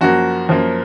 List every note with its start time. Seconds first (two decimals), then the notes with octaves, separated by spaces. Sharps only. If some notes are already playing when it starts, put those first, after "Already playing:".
0.01 F#2 F3 A#3 F#4
0.49 F#2 F3 A#3